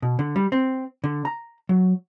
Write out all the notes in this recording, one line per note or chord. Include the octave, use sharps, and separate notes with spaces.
B2
D3
G3
C4
D3
A#5
F#3